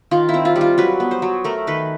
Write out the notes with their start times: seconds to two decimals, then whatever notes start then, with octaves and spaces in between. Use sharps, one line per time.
0.11 D#3 F4
0.29 E4
0.34 C4
0.45 F4
0.56 G3
0.61 F4
0.78 F#3 B4
1.00 B3
1.11 C5
1.22 F#3
1.44 A3 A#4
1.67 D#3 B4